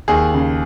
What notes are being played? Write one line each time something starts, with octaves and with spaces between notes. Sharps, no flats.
D#2 G#4
C#3